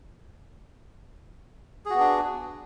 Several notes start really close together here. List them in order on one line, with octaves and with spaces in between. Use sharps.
G#4 F#4 B3 D4